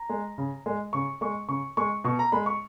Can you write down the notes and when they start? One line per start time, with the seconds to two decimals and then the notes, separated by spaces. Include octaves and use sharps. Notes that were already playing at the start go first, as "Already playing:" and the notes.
Already playing: A#5
0.09 G#3
0.38 C#3
0.66 G#3
0.93 C#3 C#6
1.21 G#3 C#6
1.49 C#3 C#6
1.77 G#3 C#6
2.04 B2 C#6
2.19 A#5
2.32 G#3 B5
2.46 C#6